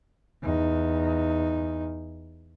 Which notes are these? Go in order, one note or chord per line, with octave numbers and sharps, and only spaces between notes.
E2 D#4